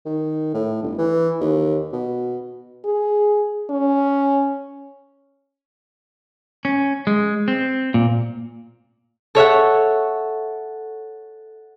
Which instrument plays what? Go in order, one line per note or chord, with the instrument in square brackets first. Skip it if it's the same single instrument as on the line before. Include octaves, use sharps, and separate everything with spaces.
[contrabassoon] D#3
A2
G1
E3
D#2
B2
[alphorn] G#4
C#4
[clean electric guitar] C#4
G#3
C4
A#2
[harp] A4 C#5 E5 F#5